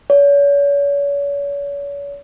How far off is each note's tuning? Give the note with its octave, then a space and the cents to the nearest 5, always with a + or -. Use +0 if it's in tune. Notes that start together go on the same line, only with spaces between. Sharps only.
C#5 +40